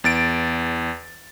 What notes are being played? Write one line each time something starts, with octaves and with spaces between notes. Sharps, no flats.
E2 A6 D7